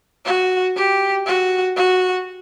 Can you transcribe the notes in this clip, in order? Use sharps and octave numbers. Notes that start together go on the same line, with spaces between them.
F#4
G4
F#4
F#4